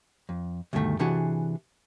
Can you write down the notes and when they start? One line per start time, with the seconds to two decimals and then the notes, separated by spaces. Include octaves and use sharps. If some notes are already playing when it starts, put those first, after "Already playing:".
0.29 F2
0.73 D2 G2 B2 D#3 A3
0.99 C3 E3 D4 F#4 G#4